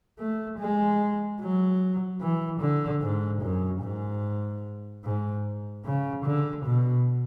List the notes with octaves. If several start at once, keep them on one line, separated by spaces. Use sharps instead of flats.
A3
G#3
F#3
E3
D3
G#2
F#2
G#2
G#2
C#3
D3
B2